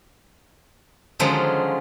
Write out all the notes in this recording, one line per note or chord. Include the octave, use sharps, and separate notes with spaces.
D3 D#3 F3 F#3 G#3 C#4